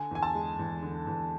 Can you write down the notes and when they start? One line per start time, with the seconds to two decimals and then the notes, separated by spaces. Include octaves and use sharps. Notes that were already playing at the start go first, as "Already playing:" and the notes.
Already playing: D3 G#5
0.11 E2 G#5
0.23 A5
0.35 G#3
0.59 E2
0.83 D3
1.07 E2